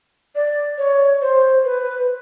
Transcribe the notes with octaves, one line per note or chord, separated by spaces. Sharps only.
D5
C#5
C5
B4